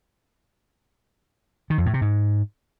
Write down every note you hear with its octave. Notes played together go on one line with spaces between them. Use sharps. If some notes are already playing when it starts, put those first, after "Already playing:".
D#3
F2
A2
C3
G#2